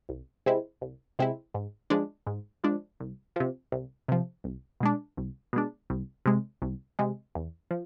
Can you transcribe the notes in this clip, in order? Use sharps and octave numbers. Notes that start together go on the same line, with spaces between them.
C2
C3 G#3 C4 E4
C2
C3 G#3 C4 E4
G#2
F3 G#3 D4
G#2
F3 G#3 D4
C2
C3 F3
C2
C3 F3
C2
B2 G#3 D4
C2
B2 G#3 D4
C2
C3 G#3
C2
C3 G#3
E2
F3